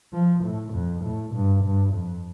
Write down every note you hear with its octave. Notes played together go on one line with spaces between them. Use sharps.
F3
A2
F2
A2
G2
G2
F2